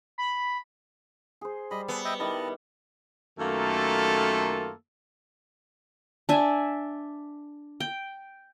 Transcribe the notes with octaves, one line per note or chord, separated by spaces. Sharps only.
B5
G#4 C5
G3 D#5 B5
B3 G#4 A4
D#5 E5 G5
D#3 G3 E4 D#5 A5
F#2 D#3 A3 A#3 F4 A4
D4 E5 G#5
G5